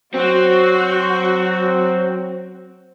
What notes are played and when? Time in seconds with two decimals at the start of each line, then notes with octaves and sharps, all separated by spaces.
0.14 F#3 C4 F#4